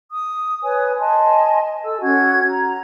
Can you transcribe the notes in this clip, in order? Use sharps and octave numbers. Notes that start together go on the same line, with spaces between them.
D#6
B4 C#5 G#5
D#5 G#5 A5 C6
A4 E6
C#4 F#4 G#6
A#5